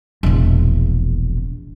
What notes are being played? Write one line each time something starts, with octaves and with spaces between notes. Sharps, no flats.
E1 A#1